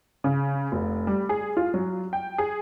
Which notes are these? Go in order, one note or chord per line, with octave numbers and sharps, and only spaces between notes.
C#3
F1
G3
G#4
F4
F#3
G5
G#4